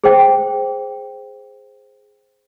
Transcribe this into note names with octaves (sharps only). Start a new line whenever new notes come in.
G#4 C5 G5